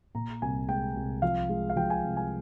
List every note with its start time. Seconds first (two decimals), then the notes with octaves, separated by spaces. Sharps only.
0.15 A#2 A#5
0.42 C2 G#5
0.68 G#3 G5
0.96 C2
1.22 F3 F5
1.49 G#3
1.70 F5
1.76 F3 G5
1.90 G#5
2.04 C2
2.17 G#5